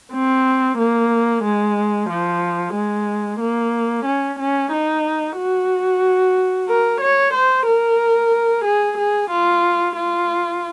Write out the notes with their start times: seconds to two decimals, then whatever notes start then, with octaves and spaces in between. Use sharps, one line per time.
0.13 C4
0.78 A#3
1.44 G#3
2.09 F3
2.74 G#3
3.40 A#3
4.06 C#4
4.39 C#4
4.72 D#4
5.37 F#4
6.69 A#4
7.01 C#5
7.33 C5
7.66 A#4
8.65 G#4
8.98 G#4
9.30 F4
9.96 F4